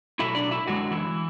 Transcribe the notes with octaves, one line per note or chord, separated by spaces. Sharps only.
B2 F#3 A3 E4 E5
D4 D5
E4 E5
F#2 D3 F#3 G#3 F#4
E3 E4